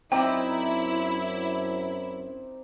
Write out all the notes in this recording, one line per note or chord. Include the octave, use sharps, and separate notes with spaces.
F#2 C4 D#4 E4 D5 G5